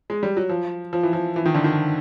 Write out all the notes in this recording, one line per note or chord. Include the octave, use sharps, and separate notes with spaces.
G#3
G3
F#3
F3
F3
E3
F3
E3
D#3
D3
D#3